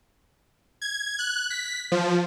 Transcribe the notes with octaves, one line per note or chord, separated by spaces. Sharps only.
G#6
F#6
B6
F3